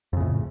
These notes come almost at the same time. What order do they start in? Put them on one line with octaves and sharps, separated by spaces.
F2 C#3 A2